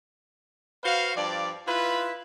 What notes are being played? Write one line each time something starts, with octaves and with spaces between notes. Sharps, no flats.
F#4 B4 C5 F5
G2 F3 D5
E4 F4 B4